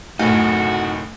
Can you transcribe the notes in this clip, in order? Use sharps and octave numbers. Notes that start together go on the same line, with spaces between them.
F#1 A2 A3 D#4 F#4 A4